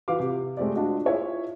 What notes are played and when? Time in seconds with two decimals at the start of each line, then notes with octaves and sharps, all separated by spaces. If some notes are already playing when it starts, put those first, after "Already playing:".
0.08 E3 F4 F#4 B4 F5 D6
0.20 C3
0.57 G#3 A3 C4 G4 D5
0.75 D4 F4 F#4 D#5
1.06 E4 F4 G#4 C#5 E5